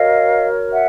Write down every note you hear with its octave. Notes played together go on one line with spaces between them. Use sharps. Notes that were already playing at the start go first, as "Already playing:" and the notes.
Already playing: F#4 A#4 C#5 D#5 F5
E5 F#5